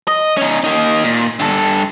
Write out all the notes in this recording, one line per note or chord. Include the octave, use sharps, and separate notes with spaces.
D#5
C#4 D#4
A#3 D#4
A#2
G2 A4